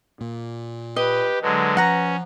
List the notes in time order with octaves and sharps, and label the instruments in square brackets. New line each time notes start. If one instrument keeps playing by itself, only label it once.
[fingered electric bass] A#2
[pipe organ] G4 [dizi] B4 [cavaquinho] D#5
[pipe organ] D3 F#3 G#3 [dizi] B4
[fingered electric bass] F3 [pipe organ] C#4 [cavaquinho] F#5 A#5